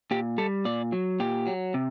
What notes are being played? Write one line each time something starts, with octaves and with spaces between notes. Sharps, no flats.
A#2 G4
G3 A4
A#2 D5
F#3
A#2 G4
F#3
C3